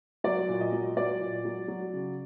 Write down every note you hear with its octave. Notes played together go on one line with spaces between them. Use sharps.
F#3 D5
A#2
D#5
F#3
F#3 D5
A#2
F#3
F#3
C#3